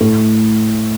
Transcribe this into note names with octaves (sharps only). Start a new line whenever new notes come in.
A2 A3